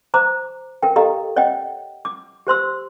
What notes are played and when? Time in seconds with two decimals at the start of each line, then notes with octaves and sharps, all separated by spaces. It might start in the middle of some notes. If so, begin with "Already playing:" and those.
0.14 C5 A#5 D6
0.83 A#4 G5
0.96 G4 A4 D#5 F5 A#5
1.36 C#5 D#5 F#5 G5
2.05 D6
2.47 G4 C5 C6 E6